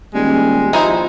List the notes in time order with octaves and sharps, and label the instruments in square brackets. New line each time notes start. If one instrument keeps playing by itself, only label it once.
[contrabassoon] D#1 [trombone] G3 [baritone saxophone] G#3
[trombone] F3 [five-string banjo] D#4 E4 C5